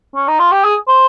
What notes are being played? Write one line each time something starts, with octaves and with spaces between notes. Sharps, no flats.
C#4
D#4
F4
G4
G#4
C5